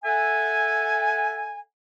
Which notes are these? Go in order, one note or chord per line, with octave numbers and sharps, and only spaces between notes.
A4 E5 F#5 G#5